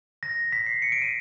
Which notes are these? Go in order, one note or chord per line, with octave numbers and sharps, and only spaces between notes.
A#6
B6
C7
C#7
D7
D#7